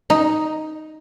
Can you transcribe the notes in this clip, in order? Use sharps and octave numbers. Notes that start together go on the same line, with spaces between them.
D#4